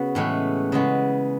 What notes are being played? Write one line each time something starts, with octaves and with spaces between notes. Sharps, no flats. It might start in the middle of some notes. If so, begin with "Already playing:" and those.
Already playing: C#3 B3 F#4
A2 E3 G#3 C#4
C#3 G#3 B3